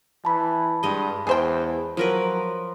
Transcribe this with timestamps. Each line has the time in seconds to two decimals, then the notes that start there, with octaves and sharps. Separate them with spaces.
0.25 E3 A5 B5
0.83 G2 G#3 D#5
1.27 E2 G#4 C5 G5
1.97 F3 F#3 A#4 B4